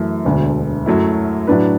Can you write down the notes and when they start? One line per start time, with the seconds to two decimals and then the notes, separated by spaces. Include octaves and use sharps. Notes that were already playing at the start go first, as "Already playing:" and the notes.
Already playing: F#2 E3 A3
0.25 E1 D2 D3
0.86 F#2 F#3 A3 E4
1.47 A2 F#3 D4 B4